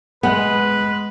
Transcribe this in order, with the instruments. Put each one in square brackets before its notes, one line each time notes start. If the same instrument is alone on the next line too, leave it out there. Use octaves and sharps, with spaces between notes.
[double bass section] G#3 [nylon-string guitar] B3 [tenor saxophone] B4